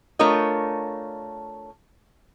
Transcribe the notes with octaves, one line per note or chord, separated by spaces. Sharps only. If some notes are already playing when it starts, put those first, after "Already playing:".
A3 D4 F4 A#4 C#5 D#5